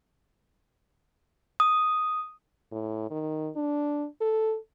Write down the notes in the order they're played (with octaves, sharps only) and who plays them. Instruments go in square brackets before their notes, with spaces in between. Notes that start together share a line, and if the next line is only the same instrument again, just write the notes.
[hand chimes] D#6
[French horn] A2
D#3
D4
A4